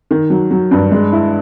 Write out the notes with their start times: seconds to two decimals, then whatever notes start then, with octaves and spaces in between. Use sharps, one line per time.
0.11 D#3
0.30 F#3
0.51 F#3
0.71 G2
0.91 G#3
1.13 E4